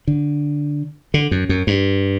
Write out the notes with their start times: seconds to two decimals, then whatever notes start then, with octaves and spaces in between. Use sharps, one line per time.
0.07 D3
1.14 D3
1.31 F#2
1.49 F#2
1.67 G2